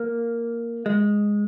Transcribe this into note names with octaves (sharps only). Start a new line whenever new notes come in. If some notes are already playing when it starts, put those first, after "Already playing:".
Already playing: A#3
G#3